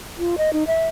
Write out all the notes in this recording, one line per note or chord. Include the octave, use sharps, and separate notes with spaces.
F4
D#5
D#4
E5